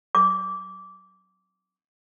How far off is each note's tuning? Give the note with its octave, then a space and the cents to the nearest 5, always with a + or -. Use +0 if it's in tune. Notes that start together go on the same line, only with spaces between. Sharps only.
D6 -20